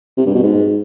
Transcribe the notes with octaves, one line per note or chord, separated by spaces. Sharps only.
C3
G2
B2
G#2